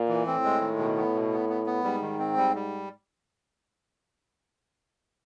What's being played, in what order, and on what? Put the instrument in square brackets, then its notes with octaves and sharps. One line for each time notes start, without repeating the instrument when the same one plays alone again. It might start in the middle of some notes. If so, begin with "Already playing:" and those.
Already playing: [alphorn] A#2
[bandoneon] E3
[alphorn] A2 [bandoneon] C4
[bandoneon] G#3
D#3
B2
B3
B2
B3
B3
B3
[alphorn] G#2 [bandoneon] G3
[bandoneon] D#3
C4
G3
G3